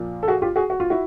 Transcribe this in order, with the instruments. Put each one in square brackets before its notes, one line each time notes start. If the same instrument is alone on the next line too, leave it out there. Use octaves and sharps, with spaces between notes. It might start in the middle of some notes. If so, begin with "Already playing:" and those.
Already playing: [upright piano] A#2 F3 A#3
A4
F#4 G#4
F4 G4
F#4 G#4
F#4
F4
E4 F#4